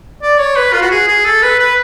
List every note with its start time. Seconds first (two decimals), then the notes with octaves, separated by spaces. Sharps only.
0.22 D5
0.39 C#5
0.56 B4
0.73 F4
0.82 F#4
0.91 G#4
1.07 G#4
1.25 A4
1.42 B4
1.59 B4